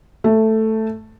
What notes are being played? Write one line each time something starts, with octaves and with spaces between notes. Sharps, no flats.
A3